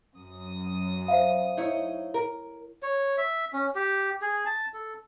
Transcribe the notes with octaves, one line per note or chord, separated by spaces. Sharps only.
F#2 D#6
C5 E5 F5
D#4 E4 C#5
A#4
C#5
E5
C#4
G4
G#4
A5
A4